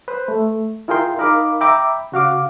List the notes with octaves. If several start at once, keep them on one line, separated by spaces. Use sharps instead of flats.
B4 C5
A3
E4 F4 G#4 A#4 G5 C6
D#4 A#4 D#5 F5 B5 D6
E5 G5 A#5 B5 D6
C#3 F#4 F5 D6